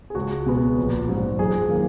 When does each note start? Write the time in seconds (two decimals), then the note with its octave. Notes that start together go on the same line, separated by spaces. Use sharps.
0.10 G#4
0.15 C#2 F#4
0.46 B2 G#3 B3
0.78 A#1
1.08 G#2 F#3
1.39 F#2 G#4
1.70 D#3 A#3